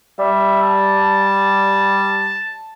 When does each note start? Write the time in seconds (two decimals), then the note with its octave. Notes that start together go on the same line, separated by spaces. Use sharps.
0.19 G3 E5
0.63 A5